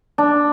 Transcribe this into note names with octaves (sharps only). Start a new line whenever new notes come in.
D4